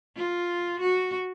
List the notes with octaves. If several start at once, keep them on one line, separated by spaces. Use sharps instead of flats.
F4
F#4